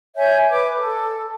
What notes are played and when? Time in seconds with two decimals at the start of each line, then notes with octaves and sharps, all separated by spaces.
0.16 C#5 E5 G#5 G6
0.49 B4 D6
0.78 A4